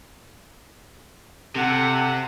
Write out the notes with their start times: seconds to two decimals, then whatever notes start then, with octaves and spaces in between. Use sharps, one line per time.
1.56 C3 G4 A4 F#5